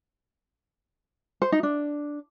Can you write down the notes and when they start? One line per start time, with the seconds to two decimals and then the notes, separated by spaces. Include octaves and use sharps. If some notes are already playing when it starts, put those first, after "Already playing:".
1.42 C5
1.52 D#4
1.63 D4